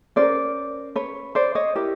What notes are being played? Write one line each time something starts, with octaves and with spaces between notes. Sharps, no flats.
C#4 F#4 C5 D5
A#4
B4 C#5
C5 D5
C#5 D#5
E4 G4 A#4